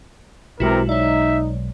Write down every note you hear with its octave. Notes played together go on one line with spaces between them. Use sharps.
B1 C3 E3 G#3 E4 F#4 A#4
D#4 C#5 D5 E5